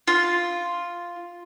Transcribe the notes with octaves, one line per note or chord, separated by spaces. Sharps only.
F4